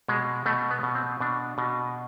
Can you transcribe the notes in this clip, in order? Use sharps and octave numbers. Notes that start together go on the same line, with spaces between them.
B2 G#3
B2 A3
B3
B2
C4
B2 D4
B2